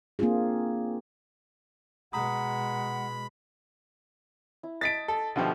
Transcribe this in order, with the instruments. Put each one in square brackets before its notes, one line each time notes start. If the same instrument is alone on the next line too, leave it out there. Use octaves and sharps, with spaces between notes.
[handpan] A#3 C4 D4 F4 G#4
[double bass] B2 G#3 [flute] F#5 [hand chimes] A#5 D#6 [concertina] B5
[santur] E4
[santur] D#5 A5 [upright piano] A6 B6 D7
[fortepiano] A4
[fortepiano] B2 D3 F3 [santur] A3 G4 A4